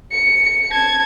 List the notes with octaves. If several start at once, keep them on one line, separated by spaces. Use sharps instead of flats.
C#7
A5 G#6